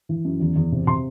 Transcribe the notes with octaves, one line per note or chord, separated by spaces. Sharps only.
E3
F#2
E2
E2
C3
C3 C6